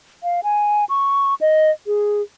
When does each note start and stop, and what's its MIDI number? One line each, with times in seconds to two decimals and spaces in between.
0.23 0.41 77
0.43 0.85 80
0.89 1.34 85
1.41 1.70 75
1.87 2.22 68